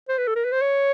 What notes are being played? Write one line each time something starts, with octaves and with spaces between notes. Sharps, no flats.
C5
B4
A4
A#4
B4
C5
C#5